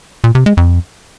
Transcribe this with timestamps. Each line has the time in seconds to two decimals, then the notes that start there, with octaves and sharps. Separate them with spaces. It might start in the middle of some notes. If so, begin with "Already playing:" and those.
0.24 A#2
0.35 C3
0.46 G#3
0.57 F2